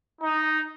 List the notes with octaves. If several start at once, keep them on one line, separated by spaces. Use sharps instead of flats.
D#4